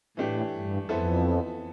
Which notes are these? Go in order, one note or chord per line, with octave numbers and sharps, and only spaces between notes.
A2 E3 A3 D4 G4
G2
F2 E3 B3 E4 A4 C5